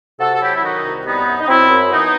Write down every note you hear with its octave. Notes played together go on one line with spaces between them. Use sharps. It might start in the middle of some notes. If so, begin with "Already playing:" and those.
C3 F#4 A4
A4
F#3 E4 G4
E4
D#3 D#4 F#4
C2
G3 B3 D#4
F#2
D#4
F#2 C4 E4
F#2
E3 B3 D#4